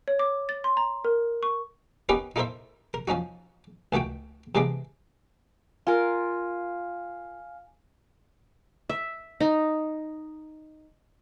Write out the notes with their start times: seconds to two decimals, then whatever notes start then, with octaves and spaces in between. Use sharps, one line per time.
0.08 C#5
0.19 D6
0.49 A6
0.64 C6
0.77 A#5
1.05 A#4
1.43 C#6
2.09 B3 C#4 D#4 G4 A#4 B4
2.36 D#4 E4 A4 A#4 C5 E5
2.94 A#4
3.08 F3 C#4 D#4 F#4
3.93 C#2 D#3 A3 F#4 G5
4.55 C3 E3 G#3 B3 D4
5.87 F4 A#4 F5 G#5 F6
8.89 E5
9.40 D#4